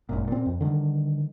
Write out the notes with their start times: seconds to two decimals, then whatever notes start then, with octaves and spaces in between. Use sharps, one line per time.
0.09 G#1 F#2 A#2
0.28 A#2 C4
0.46 F2
0.61 D3 D#3 G3